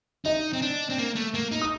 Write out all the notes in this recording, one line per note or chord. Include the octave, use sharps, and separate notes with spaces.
D#4 D#5
C4
D4
C4
A#3
A3
A#3
D#4
D#6